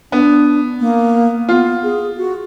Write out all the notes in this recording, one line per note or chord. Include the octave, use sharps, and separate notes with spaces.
B3 D4
A#3
B3 F4
G#4
F#4